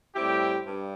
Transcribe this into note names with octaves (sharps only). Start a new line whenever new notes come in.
A2 G3 C4 E4 G4
G2